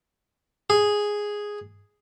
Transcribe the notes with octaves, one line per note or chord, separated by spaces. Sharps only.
G#4